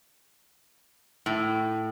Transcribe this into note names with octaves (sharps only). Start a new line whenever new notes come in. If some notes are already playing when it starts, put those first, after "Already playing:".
A2